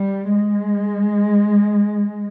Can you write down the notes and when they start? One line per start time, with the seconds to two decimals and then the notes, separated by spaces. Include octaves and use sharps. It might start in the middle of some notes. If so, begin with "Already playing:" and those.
Already playing: G3
0.34 G#3